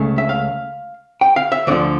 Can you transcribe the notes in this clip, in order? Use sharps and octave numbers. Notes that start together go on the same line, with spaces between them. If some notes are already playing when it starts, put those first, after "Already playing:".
Already playing: C#2 C#3 A3
E5
F5
G5
F5
E5
D2 D3 F3 D5